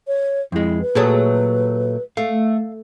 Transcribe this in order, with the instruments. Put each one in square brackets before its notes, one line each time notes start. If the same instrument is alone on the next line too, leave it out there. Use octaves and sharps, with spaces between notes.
[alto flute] C#5
[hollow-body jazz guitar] F2 G#3 [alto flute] E4
[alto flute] B4
[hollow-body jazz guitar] A#2 A5 [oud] F#3 A3 G#4
[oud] A3 [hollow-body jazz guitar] F5